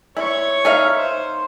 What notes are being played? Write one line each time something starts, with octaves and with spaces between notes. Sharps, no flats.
E4 C#5 C#6
D#4 E5 F5
C5